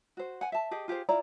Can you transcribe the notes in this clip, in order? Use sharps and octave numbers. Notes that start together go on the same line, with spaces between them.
F#4 C5
F#5 G#5
E5 A5
G4 G#4 D#5
F4 G4 G#4 C5
E4 F4 D5 A#5